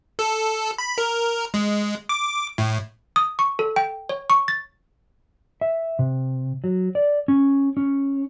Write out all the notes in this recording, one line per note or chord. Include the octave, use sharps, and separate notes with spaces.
A4
B5
A#4
G#3
D6
A2
D#6
C#6
A4
G5
C#5
C#6
A6
E5
C3
F#3
D5
C#4
C#4